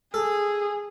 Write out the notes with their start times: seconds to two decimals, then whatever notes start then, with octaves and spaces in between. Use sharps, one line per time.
0.14 G#4 A4